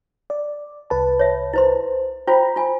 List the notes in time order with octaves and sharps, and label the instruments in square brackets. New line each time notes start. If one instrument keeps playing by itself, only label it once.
[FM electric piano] D5
C2 B4 A5
[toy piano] C#5 E5
E4 C5 C6
[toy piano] F4 C5 [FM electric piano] G5 A#5 B5
[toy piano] F4 G#5